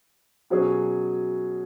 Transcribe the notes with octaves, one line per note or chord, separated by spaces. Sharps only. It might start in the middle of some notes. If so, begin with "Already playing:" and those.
B2 F#3 C#4 G#4